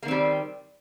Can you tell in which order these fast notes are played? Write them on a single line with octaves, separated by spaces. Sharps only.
A#3 D#3 C4 G3